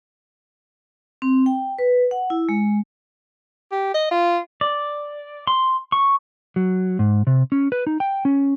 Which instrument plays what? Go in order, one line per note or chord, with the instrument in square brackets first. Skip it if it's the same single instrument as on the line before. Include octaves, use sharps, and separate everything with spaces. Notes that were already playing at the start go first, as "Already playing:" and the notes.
[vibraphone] C4
G5
B4
F#5
E4
G#3
[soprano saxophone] G4
D#5
F4
[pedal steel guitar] D5
C6
C#6
[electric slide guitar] F#3
G#2
C3
C#4
B4
D#4
G5
C#4